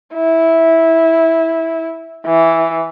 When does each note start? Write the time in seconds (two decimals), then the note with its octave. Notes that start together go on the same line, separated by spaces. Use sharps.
0.14 E4
2.25 E3